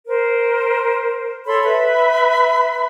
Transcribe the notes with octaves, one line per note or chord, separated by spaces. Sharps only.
A#4 C5
A4 C#5 B5 C6
B4 E5 B5